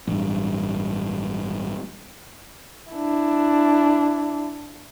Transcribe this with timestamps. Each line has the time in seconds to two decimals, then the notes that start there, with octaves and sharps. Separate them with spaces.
0.07 A1 G2
2.92 D4 E4